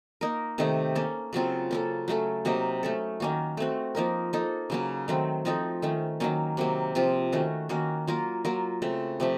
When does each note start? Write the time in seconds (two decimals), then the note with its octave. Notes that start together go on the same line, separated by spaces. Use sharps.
0.21 A#3 D#4 A#4
0.58 C3 D#3 A3 D#4
0.95 A#3 C#4 A4
1.33 C#3 F#3 C4 F4
1.71 A#3 C#4 A4
2.08 F#3 A3 C#4 A4
2.45 C3 F#3 A#3 D#4
2.83 A3 C#4 A4
3.20 D#3 A#3 C#4 F#4
3.57 A3 C4 F#4
3.95 F3 A#3 D#4 A#4
4.33 A#3 D#4 A4
4.70 C#3 F#3 A#3 C#4
5.08 D#3 F#3 A3 C4
5.45 F3 C4 D#4 A4
5.82 D#3 A3 C#4
6.20 D#3 F#3 A#3 C#4
6.57 C3 F#3 A#3
6.95 C3 F3 C4 F4
7.32 D#3 A3 C#4 F#4
7.69 D#3 A#3 C#4 F#4
8.07 F#3 A#3 F4 A#4
8.45 F#3 A#3 F4 A#4
8.82 C#3 A3 C4
9.20 C3 F3 A3